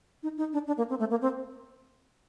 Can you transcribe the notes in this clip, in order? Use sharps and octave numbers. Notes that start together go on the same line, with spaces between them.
D#4
D#4
D4
D4
A#3
C4
A3
A#3
C4